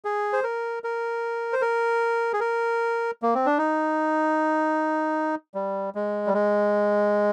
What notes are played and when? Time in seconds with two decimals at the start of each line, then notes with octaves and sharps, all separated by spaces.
0.05 G#4
0.33 C5
0.44 A#4
0.84 A#4
1.53 C5
1.61 A#4
2.33 G#4
2.40 A#4
3.22 A#3
3.35 C4
3.46 D4
3.58 D#4
5.54 G3
5.95 G#3
6.27 G3
6.34 G#3